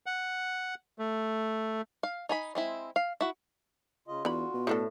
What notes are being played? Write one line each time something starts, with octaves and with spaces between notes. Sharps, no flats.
F#5
A3
F5
D#4 G#5 B5
G#3 C4 E4
F5
E4 F#4
C#3 F4 D#5
E2 D3 F4 F#4 B5
B2
A2 A3 D4 A4